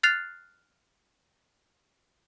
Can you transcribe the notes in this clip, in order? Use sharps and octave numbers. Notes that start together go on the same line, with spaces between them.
F6 F#6 A6 C7 F7